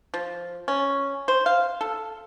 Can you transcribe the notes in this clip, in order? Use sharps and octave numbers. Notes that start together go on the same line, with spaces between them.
F3
C#4
C5
F5
A4